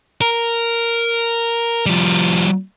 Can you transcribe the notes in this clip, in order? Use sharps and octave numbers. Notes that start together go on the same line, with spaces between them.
A#4
F3 G3